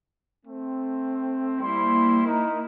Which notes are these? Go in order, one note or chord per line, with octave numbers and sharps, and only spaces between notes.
A3 C4
G3 A#3 E4 C5 C6
D#4 A#4